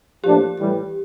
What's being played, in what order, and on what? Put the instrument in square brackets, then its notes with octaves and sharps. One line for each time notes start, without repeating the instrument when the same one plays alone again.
[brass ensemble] A2 F3 A#3 D4 [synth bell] G4
[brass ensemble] A2 E3 G3